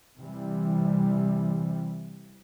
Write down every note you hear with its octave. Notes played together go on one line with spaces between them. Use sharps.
C3 E3 G3